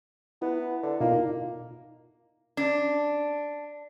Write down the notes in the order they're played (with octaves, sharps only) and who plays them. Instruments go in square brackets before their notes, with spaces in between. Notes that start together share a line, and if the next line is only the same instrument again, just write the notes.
[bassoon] B3 [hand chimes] E4
[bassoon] D3
[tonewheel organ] B2 D#4 F4 [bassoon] A#3
[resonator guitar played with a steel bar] D4